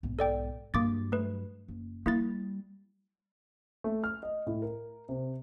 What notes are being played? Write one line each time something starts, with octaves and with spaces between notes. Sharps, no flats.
B1 G#2
A4 D5 G5
G2 F#3 A#3 D6 A6
A3 B4
F#1
G3 A#3 E4 A6
A3
F6
D#5
A2
A#4
C3